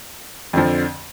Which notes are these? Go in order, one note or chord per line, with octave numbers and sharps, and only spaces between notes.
F2 D3 F3